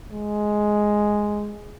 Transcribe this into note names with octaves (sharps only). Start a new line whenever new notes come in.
G#3